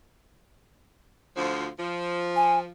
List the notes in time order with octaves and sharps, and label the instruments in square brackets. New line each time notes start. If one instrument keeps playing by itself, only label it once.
[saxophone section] D2 F3
F3
[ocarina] G#5